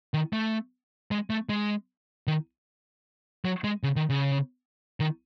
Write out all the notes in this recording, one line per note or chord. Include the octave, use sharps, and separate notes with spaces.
D#3
A3
G#3
A3
G#3
D#3
F#3
G#3
C#3
D#3
C#3
D#3